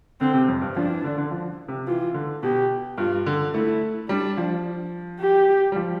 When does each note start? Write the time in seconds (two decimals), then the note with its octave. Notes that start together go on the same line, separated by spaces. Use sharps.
0.21 D3 C4
0.34 C3
0.48 F2
0.61 G2
0.76 F3 D4
0.90 E3
1.04 D3
1.18 D3
1.31 F3
1.68 C3
1.87 E3 F4
2.14 D3
2.43 B2 G4
2.98 G2 F4
3.26 D3
3.54 A3 E4
4.09 G3 D4
4.37 F3
5.21 G4
5.72 G3
5.76 F3